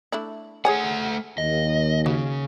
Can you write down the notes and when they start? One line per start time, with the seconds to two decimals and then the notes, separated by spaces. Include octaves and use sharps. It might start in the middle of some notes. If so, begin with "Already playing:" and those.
0.12 A3 D4 E4
0.65 A3 G#4 C#5 F#5 G#5
1.38 D#2 D#5
2.06 C#3 F#4